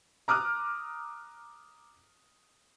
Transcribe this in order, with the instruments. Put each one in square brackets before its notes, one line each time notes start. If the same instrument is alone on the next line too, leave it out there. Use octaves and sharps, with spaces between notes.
[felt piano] A#5 D6 D#6 F6 F#6